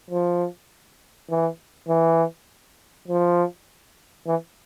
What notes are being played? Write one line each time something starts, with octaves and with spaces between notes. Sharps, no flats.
F3
E3
E3
F3
E3